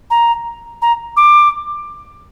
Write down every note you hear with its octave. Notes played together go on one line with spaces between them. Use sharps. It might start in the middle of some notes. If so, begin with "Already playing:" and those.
A#5
A#5
D6